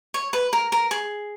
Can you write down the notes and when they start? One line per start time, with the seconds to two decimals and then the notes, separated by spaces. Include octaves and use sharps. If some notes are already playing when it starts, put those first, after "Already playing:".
0.14 C#5
0.33 B4
0.53 A#4
0.72 A#4
0.91 G#4